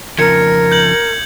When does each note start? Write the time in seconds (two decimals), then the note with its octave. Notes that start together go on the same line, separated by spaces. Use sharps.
0.19 F2 C#3 F3 A#4 G#6 C#7
0.72 G6 F#7